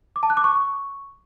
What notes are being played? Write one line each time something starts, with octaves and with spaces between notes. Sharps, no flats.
D6
A5
F#6
D6
C#6